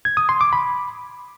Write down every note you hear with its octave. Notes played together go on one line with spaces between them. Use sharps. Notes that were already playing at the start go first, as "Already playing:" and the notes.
G#6
D#6
C6
D6
B5